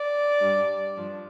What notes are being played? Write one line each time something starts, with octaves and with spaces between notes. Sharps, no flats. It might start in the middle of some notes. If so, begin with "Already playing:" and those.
Already playing: D5
G2 G3 D4
G2 F3 D4